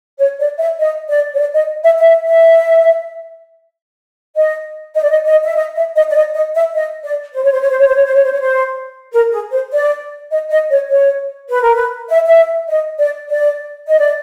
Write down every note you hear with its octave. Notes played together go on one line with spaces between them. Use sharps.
C#5
D5
E5
D#5
D5
C#5
D5
D#5
E5
E5
E5
D#5
D#5
D5
D#5
D#5
E5
D#5
E5
D#5
D5
D#5
D#5
E5
D#5
D5
C5
C#5
C5
C#5
C5
C#5
C5
C#5
C5
C#5
C5
C#5
C5
A#4
G#4
C5
D5
D#5
D#5
C#5
C#5
B4
A#4
B4
E5
E5
D#5
D5
D5
D#5
D5